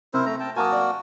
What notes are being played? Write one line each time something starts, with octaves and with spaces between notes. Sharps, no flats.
C3 E4 A#4 C5
A3 A#5
G5 A5
A#3 F#4 A#4 G#5 A5 D#6
D5